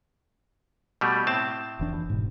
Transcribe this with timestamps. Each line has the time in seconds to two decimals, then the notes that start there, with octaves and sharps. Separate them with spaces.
1.01 B2 G3 A3
1.27 A2 C4 A5
1.79 F1 E3 D4
2.10 G#2 B2